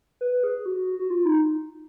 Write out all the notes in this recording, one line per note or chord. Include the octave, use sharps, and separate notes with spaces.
B4
G#4
F#4
F#4
F4
D#4